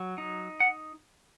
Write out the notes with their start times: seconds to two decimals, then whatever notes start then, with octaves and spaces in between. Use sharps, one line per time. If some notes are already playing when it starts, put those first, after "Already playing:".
Already playing: F#3
0.18 D#4
0.60 F#5